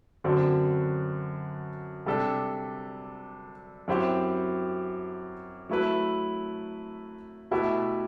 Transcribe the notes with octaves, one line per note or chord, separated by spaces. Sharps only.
F#2 D3 F#3 C4
C3 G3 D4 A4
F#2 F#3 C4 E4 G4
F#3 A3 E4 B4
B2 A3 E4 G4 B4